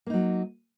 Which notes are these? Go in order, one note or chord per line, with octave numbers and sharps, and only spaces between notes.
F#3 A#3 D#4